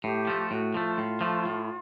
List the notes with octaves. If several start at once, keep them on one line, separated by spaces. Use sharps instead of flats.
A2 G4
F3 A3
A2 F#4
F3 A3 F4
A2
F3 A3
A2